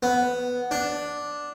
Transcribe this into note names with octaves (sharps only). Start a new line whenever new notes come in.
B3
D4